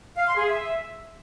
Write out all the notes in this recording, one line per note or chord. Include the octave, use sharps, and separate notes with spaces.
F5
C6
G#4
E5